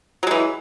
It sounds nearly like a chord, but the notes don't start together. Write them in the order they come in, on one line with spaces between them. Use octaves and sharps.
F#3 G#3 E3